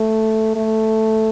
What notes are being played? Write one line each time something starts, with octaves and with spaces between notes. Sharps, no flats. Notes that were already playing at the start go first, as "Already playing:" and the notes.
Already playing: A3
A3